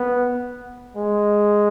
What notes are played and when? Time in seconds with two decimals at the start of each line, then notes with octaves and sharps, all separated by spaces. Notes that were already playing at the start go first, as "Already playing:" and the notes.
Already playing: B3
0.96 G#3